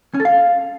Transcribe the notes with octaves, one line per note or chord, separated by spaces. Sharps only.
C#4
A4
F5